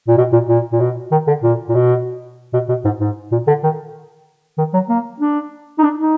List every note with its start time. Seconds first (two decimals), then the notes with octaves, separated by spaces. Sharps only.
0.08 A#2
0.18 B2
0.33 A#2
0.49 A#2
0.72 A#2
0.80 B2
1.12 D#3
1.28 D3
1.43 A#2
1.69 A#2
1.75 B2
2.54 B2
2.69 B2
2.85 G#2
3.00 G#2
3.32 A#2
3.47 D3
3.64 D#3
4.58 D#3
4.74 F#3
4.89 A#3
5.20 D4
5.79 D#4
5.84 D4
6.00 D#4